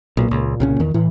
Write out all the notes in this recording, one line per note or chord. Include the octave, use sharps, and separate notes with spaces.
B1 A#2
C#2
C2 C#3 C#4
E2 D#3
A2 E3